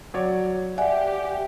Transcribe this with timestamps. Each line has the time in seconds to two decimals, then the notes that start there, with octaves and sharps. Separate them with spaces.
0.14 F#3 C#5 D5
0.78 G4 D5 E5 F#5 G#5